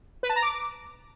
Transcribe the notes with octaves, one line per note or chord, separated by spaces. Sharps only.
B4
A5
A#5
D6